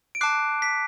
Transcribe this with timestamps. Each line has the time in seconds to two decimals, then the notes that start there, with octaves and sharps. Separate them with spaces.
0.15 D7
0.21 A5 D6 F#6 C7
0.62 B6